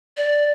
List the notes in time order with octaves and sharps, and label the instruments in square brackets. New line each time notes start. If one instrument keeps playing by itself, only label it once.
[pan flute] D5